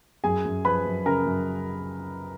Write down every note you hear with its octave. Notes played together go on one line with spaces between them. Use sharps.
F#2 G#4 G#5
F#2
F3 B4 B5
F#2
C#3 A#4 A#5
F#2